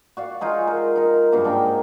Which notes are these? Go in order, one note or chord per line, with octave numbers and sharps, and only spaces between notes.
F#4 D5 F5
G#3 D#4 F4 G#5
A#4
D#4 A#4
G2 C#3 F#3 A#3
G#2 D4 G5 A#5